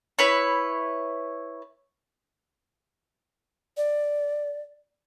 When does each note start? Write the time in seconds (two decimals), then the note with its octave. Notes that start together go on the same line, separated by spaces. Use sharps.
0.19 E4 B4 C#5
3.77 D5